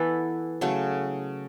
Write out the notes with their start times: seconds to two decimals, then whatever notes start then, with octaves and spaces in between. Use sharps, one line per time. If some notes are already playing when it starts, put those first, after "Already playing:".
Already playing: E3 B3 E4 A4
0.61 C#3 F#3 A3